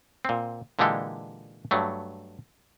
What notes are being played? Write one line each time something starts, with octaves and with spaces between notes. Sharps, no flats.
A#2 C4
A#2 D3 E3 G#3 G4 A4
G2 F#3 A3